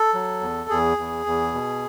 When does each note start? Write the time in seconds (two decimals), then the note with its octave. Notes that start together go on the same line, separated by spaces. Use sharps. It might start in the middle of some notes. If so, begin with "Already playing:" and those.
Already playing: A4
0.14 F#3
0.41 E2
0.70 E2 G#4
0.97 E2
1.26 E2
1.54 B2